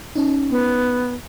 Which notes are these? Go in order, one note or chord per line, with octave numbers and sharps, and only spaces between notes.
C#4 D#4
B3